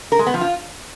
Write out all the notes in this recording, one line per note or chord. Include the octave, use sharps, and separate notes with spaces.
A#4
G#3
B3
F3
F4